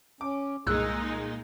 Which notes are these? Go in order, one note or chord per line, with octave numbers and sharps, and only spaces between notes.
C#4 D6
C2 A#2 G#3 D#4 G#4 E6 F#6